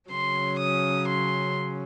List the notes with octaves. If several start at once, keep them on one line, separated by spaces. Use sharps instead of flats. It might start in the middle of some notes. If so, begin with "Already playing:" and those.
C#3 F#3 C#4 C6
D#6
C6